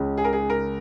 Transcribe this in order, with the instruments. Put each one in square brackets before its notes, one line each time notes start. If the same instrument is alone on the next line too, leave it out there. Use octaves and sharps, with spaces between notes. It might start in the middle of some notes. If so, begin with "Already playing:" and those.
Already playing: [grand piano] C#2 C#3 G#3 C#4
[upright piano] G#4
A#4
G#4
A#4